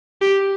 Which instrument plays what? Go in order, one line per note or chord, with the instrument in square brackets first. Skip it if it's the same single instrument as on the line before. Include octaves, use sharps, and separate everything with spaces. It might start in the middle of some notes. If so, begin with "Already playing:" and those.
[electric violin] G4